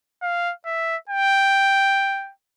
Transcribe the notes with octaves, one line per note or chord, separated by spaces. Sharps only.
F5
E5
G5